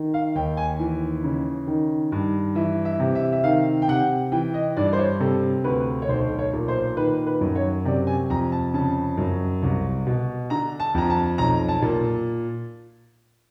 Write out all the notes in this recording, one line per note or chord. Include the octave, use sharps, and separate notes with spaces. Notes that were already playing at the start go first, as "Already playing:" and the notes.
Already playing: D#3
F5
D#2 G5
G#5
E3
C#3
D#3
G2
E3 E5
E5
C3
E5
E5
D#3 F5
G5
C3 F#5
E3 G5
D#5
G2 D5
C5
C#5
C3 A4
D2 B4
C#5
B1 C5
C#5
A#2
C5
D#3 B4
B4
F#2
C#5
C3 D5
G#5
F2 A#5
A5
C#3 A5
F#2
C2
B2
D3 A#5
A5
F2 A#5
A5
B1 A#5
A5
A#2